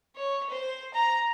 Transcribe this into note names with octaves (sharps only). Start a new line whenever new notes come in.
C#5
C5
A#5